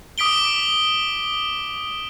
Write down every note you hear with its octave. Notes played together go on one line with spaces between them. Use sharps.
D6 D#6 B6 D7 G7